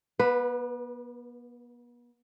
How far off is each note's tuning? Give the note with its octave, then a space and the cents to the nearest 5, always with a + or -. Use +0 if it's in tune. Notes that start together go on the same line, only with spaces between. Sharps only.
B3 -40 B4 +0